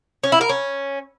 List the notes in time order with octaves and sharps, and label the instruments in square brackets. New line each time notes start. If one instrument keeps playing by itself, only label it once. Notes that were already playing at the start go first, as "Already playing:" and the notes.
[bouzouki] C#4
E4
A#4
C#4